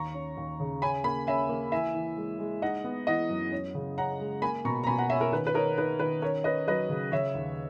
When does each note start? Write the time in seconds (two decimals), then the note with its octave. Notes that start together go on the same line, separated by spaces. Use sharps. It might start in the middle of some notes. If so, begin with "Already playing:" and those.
Already playing: D#2 A#5 C#6
0.14 C#4
0.37 D#2
0.60 C#3
0.82 C#4 G#5 B5
1.04 A#3 G#5 B5
1.27 C#4 E5 G#5
1.49 A#3
1.72 E3 E5 G#5
1.94 E3
2.17 G#3
2.39 G#3
2.62 D#4 D#5 F#5
2.84 B3
3.07 E3 D#5 F#5
3.29 F#2
3.52 C#4
3.75 C#3
3.98 C#4 F#5 A#5
4.20 G#3
4.42 A#3 G#5 B5
4.65 B2 A#5 C#6
4.83 A#5
4.87 B2 G#5 B5
4.99 F#5 A#5
5.10 C#4 E5 G#5
5.21 A#4
5.32 D#3 B4
5.47 B4
5.54 D#4 A#4 C#5
5.78 D#4 B4
6.00 D#3 B4
6.22 C#4 A#4 C#5
6.44 C#4 B4 D#5
6.68 F#3 B4 D#5
6.89 C#3
7.12 C#3 C#5 E5
7.34 D#2